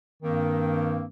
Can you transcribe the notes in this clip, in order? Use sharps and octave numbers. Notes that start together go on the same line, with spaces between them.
G2 D#3 A#3 C4